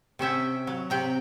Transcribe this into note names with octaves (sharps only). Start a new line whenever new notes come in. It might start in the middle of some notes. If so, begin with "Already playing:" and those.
C3 C#4 E5 G5
F#3
C3 G5 A#5